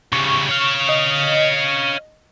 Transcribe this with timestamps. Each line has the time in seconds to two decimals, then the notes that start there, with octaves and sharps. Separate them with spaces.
0.13 C#3 G3 C#6
0.49 C#5 F5
0.89 D#5